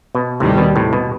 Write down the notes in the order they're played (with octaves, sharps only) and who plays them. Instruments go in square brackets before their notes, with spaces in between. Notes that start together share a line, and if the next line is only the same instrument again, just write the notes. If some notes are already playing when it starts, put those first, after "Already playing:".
[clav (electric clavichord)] B2
[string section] D#2 D#3 G3 [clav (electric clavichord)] A2 C3
[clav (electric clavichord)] B2
A2 C3
B2